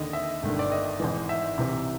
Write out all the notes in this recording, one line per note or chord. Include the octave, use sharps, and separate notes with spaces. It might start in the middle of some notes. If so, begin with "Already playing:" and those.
Already playing: D#2 D3 D#5
E5
G1 G2 D#3
D5
D#5
G#1 G#2 E3
E5
C2 C3 E3